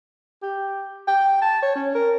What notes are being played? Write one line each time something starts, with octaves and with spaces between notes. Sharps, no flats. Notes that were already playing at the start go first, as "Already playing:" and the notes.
G4
G5
A5
C#5
C#4
A#4